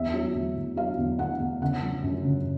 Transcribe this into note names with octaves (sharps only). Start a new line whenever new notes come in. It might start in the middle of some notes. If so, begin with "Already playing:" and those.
Already playing: E2 E5
F#3
E2
E2
F#3 F5
E2
E2 F#5
E2
C#3 F#5
F3
F#2
C#3